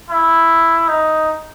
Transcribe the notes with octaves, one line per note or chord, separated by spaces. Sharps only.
E4
D#4